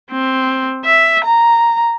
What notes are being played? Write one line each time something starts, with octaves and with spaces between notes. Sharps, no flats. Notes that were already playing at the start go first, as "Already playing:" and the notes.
C4
E5
A#5